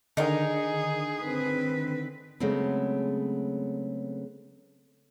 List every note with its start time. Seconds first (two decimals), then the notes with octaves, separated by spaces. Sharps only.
0.17 D3 D#3 D#4 G#4 A#4
1.22 C4 B4
2.40 C#3 F#3 G#3 A3 B3 C4